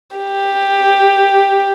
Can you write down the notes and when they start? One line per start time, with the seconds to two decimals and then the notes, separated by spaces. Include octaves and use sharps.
0.17 G4